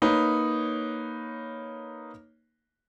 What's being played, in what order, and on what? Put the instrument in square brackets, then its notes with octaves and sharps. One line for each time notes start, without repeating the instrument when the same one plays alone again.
[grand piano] A#3 D#4 B4 C#5